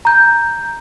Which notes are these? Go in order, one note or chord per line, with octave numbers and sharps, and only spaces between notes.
A#5 G6